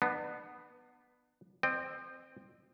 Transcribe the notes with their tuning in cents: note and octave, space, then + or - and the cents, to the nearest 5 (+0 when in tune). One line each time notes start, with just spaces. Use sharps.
B3 +0 D4 +40
C4 +0 D#5 -40 G5 +10